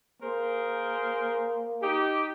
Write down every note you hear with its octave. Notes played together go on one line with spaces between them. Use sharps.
A#3 G#4 A#4 C5
D#4 G4